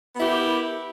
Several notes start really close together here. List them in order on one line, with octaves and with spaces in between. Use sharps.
B3 E4 G4 A#4